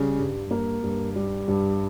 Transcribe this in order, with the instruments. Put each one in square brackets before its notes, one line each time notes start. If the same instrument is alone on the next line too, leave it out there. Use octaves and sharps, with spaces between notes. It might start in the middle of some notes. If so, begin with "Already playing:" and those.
Already playing: [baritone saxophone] C#3 [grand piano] G3
[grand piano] G2
A#3
G2
G3
G2